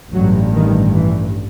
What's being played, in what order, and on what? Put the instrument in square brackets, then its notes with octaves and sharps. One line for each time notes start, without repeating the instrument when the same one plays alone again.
[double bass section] A1 G2 F#3
D#3
E3